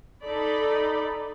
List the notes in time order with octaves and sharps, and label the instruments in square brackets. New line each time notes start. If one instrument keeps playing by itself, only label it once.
[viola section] D#4 A4 D5 B5